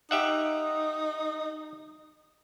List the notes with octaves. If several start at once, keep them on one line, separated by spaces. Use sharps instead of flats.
D#4 G4 E5 F#5